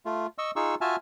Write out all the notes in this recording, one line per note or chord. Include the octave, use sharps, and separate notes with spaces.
A3 F4
D#5 C#6 E6
D#4 F4 G#4 C#6 E6
F4 F#4 E5 G#5 A5 F6